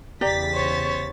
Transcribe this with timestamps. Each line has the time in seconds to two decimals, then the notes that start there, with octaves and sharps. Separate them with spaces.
0.21 E2 C#3 G4 D5 A#5 A6 B6
0.54 C5 C#5